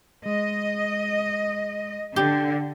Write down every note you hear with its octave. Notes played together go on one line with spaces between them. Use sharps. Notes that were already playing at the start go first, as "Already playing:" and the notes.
G#3 D#5
D3 G4